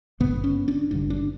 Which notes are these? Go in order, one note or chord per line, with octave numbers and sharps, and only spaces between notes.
G#1 G2 D3 B3
C#4
D4
G#1 G2 D3 D4
D4